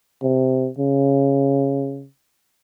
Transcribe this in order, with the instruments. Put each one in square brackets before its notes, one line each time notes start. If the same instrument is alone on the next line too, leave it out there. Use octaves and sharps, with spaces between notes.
[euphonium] C3
C#3